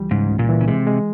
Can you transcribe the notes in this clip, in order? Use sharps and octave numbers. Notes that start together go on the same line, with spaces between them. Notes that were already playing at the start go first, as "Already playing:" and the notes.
Already playing: C#2 E3 G3
G#2 C#3
C#2
A#2
E3
C#3
C3 G#3
G#3